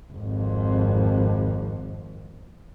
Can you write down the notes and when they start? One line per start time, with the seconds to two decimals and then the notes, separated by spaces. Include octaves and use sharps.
0.14 G#1 F2